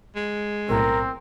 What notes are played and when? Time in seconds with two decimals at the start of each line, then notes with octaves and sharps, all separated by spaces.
0.16 G#3
0.69 B1 A2 C4 A#4